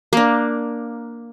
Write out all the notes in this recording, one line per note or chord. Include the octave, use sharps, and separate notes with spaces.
A#3 D4